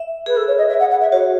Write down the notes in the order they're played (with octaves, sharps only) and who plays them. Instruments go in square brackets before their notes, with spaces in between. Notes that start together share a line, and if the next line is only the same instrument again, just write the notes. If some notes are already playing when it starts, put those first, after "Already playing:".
Already playing: [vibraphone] E5
[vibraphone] G#4 [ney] B4
[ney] A4
C#5
D#5
E5
F#5
F#5
E5
[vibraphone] F#4 [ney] C#5